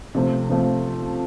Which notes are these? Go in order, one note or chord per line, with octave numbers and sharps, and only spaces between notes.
C3 F3 A3 C4
C3 F3 A3